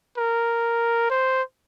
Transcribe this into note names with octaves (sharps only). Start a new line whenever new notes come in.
A#4
C5